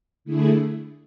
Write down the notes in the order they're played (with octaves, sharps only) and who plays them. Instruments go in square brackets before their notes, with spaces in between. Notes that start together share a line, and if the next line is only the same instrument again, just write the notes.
[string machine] D3 A3 E4 G#4